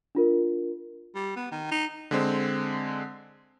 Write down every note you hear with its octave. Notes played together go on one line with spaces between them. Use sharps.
D4 F4 A#4
G3
B3
D#3
D#4
D3 G#3 C4